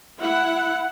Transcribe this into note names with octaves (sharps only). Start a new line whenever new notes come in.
E4 F#5